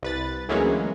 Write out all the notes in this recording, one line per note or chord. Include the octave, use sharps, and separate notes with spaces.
C2 B4 A6
D2 E3 F#3 G#3 A#3 C#4